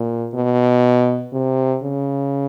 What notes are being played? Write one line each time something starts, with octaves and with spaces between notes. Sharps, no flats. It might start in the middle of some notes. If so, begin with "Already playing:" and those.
Already playing: A#2
B2
C3
C#3